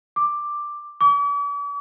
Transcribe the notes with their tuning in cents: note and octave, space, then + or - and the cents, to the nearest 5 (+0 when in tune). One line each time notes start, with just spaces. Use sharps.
D6 +5
D6 -45